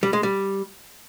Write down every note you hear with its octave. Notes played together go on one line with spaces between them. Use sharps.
G3
G#3
G3